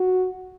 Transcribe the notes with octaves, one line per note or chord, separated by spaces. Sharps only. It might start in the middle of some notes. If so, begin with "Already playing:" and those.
Already playing: F#4